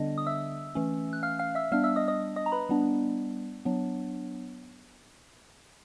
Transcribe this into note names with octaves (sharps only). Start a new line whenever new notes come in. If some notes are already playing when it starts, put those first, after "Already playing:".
Already playing: D3 G3 B3 D4 D#5
D#6
E5 E6
E3 A3 C#4
F#6
F5 F6
F5 F6
E5 E6
G3 B3 D4 F5 F6
E5 E6
D#5 D#6
D#5 D#6
D#5 D#6
A#5
B4 B5
G3 B3 D4
F#3 B3 D4